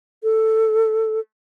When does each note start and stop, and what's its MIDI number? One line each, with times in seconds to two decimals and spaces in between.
0.23 1.20 69